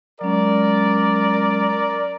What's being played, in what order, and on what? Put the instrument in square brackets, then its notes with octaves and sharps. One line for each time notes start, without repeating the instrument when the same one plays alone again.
[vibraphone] F#3 G#3 C#4 [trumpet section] A#4 D5